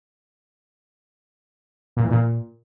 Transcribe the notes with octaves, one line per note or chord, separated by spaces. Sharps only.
A#2
E2
A#2